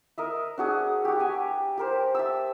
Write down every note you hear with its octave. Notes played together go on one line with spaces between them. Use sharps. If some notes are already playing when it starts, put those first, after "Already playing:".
A#4 D#5 E5
D4 F#4 G#4
F#4 G4
G4 G#5
G4 A#4 C5
E5 A5 E6